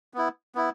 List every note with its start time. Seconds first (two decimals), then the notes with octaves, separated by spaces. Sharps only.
0.14 B3 E4
0.55 B3 E4